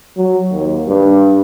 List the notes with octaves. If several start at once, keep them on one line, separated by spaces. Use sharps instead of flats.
F#3
D#2
G2